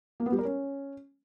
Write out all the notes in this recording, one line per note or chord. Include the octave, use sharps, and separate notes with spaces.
A#3
B3
G3
A#4
C#4